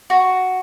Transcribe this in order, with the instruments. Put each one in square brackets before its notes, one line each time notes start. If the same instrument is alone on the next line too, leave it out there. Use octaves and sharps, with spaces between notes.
[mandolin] F#4